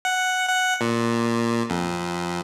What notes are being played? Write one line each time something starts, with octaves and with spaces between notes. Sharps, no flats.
F#5
F#5
A#2
F2